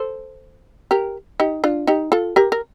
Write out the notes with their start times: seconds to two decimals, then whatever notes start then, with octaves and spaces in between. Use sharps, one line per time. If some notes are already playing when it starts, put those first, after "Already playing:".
Already playing: A4 C5
0.91 G4 A#4
1.40 D#4 G4
1.64 D4 F4
1.87 D#4 G4
2.12 F4 A4
2.36 G4 A#4
2.52 A#4